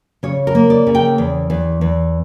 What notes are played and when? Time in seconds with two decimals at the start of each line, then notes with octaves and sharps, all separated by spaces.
0.23 C#3 C#5
0.47 A#4
0.55 A#3
0.70 D5
0.87 C#3
0.95 G5
1.18 E2
1.50 E2
1.81 E2